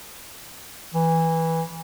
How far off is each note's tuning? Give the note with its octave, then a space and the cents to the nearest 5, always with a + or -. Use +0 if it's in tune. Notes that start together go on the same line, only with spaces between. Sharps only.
E3 -10